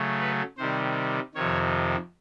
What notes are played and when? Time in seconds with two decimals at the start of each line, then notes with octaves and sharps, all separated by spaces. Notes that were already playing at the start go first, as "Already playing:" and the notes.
Already playing: C#3 F#3 A3
0.20 B4
0.57 C3 D#3 G3 C5
1.35 F2 C3 D#3 C#5